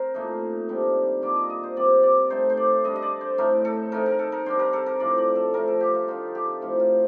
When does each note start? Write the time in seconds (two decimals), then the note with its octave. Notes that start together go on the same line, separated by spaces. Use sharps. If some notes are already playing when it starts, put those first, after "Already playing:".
Already playing: C4 A#4 C5
0.14 A#2 A3 D#4
0.69 C3 D#3 G3 D4
1.22 A#2 G3 A#3 D4 D5
1.36 D#5
1.50 D#5
1.63 C5
1.77 C3 G3 C4 D5
2.03 D5
2.30 D#3 A3 C4 D#4 C5
2.50 C5
2.57 D5
2.84 D3 G3 D4 D#5
2.96 D#5
3.02 D5
3.21 C5
3.38 A2 A3 C4 D#4 A#4
3.65 A4
3.92 D#3 A3 C4 D#4 A#4
4.06 A#4
4.19 A4
4.32 A#4
4.46 D#3 G3 D4 C5
4.59 A#4
4.73 A4
4.86 A#4
5.00 A2 F3 A3 D5
5.18 D5
5.35 A4
5.54 F3 A3 C4 A#4
5.68 A4
5.81 G4
5.95 F4
6.08 D3 F3 C4 D#4 F4
6.35 G4
6.61 A2 F3 C4 D#4 F4
6.80 F4